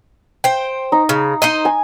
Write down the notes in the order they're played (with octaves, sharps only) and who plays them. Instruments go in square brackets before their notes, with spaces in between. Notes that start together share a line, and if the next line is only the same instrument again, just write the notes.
[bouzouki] C5 G5
[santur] D#4
[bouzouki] C#3
D#4 C5 D#5
[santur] G#5